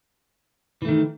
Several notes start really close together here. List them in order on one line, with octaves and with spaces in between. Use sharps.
E3 A3 D#3